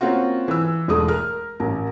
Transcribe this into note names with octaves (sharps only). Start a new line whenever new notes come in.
A#3 C4 C#4 F4 F#4
E3 E6
E1 G#3 A3 D#6
A#4 F6
A1 A#4